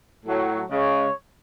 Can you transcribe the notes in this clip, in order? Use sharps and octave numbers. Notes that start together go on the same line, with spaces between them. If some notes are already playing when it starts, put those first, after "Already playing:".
A2 F#3 A3
C#3 G#3 C#5